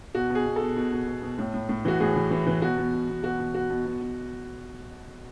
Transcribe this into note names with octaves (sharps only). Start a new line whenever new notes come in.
B2 F#4
B2
G#4
B2
A4
B2
B2
B2
B2
B2
A2
A2
A2
E3 F#4
A2 G#4
E3
E3
E3
B2 F#4
B2
B2
B2
B2 F#4
B2
B2 F#4
B2
B2
B2